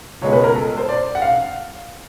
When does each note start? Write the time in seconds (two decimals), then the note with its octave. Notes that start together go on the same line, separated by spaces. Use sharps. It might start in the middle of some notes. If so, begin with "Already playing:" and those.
0.22 C#2 B2 G#3 C#5
0.33 B4
0.44 A#4
0.55 A4
0.78 C5
0.89 D5
1.15 F#5
1.22 F5